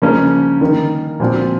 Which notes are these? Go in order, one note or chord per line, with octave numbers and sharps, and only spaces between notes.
C#3 F3 A#3 C#4
D#3 A#3 D#4 A#4
A#2 F3 C4 F#4